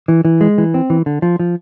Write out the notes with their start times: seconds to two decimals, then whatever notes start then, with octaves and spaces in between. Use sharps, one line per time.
0.08 E3
0.25 E3
0.41 G#3
0.58 E3
0.74 C4
0.90 E3
1.06 D3
1.22 F3
1.39 F3